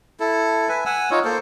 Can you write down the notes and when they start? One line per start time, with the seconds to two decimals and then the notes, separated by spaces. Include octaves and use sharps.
0.20 E4 A4
0.69 B4 E5 G#5
0.86 F#5 G#5 E6
1.11 D#4 F4 C#5
1.25 A#3 A4 C5